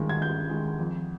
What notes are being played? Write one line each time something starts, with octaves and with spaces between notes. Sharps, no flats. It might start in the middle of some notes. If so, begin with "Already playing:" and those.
Already playing: G2 D#3 G#3
G#6
G2 G6
D#3 G#3
F2